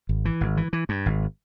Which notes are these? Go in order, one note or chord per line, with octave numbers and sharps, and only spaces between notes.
G#1
E3
G#1
E3
E3
G2
G#1